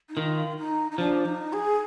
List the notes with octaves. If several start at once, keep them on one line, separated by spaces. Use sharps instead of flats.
D#4
D#3 F4
D#4
D#4
F3 D4
D#4
G#4